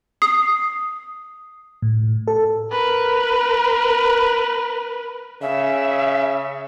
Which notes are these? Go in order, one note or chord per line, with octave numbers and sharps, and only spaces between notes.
D#6 C7
A2
A4
A#4 B4
C#3 E5